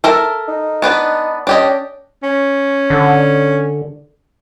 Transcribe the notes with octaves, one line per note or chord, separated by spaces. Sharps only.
A4 A#4 E5
D#4
B3 D4 B4
C#4 D4 G4 D#5
C#4
D3